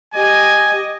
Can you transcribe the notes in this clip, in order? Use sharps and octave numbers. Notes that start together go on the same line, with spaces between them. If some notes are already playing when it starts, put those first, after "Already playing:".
G4 D#5 G#5